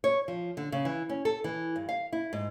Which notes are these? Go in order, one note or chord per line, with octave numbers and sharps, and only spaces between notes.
C#5
F3
D3
C#3
E3
C#4
A4
E3
G2
F5
E4
G#2